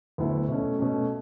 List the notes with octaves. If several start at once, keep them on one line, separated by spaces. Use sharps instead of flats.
D2 D3 F#3 B3 E4
B2 A3 C#4
B2 A3 C#4